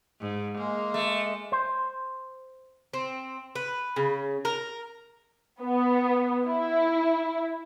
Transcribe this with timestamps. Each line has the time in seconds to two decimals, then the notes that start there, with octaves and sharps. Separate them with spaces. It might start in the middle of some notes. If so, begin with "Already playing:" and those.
0.20 G#2
0.58 G#3 A#3
0.94 A3
1.52 C5
2.94 C4
3.56 B4
3.96 C#3
4.45 A#4
5.61 B3
6.47 E4